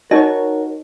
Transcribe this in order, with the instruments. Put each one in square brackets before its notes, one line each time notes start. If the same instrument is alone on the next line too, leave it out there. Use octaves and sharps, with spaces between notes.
[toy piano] D#4 D#5 [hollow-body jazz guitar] F#4 C#5 [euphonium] A#4